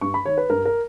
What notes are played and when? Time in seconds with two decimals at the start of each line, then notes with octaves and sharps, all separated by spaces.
0.01 G2 C#6
0.14 B5
0.26 D#3 C#5
0.38 B4
0.50 G2 A#4
0.66 A#4